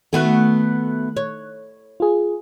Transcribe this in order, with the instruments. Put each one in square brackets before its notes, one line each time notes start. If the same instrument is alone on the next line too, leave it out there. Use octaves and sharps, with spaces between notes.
[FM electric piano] D#3 F#6 [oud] A3 B3 F#4
[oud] C#5
[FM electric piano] F4 G#4